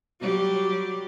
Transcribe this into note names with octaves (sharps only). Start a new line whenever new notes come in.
F#3 G3 G4